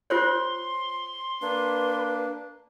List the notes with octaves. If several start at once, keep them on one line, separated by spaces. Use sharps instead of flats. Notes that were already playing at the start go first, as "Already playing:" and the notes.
F4 C5 C#5 C6
A#3 D4 B4